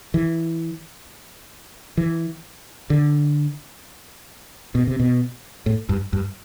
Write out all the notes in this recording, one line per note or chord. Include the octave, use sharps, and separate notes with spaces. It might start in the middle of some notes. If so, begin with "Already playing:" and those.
E3
E3
D3
B2
C3
B2
A2
G2
G2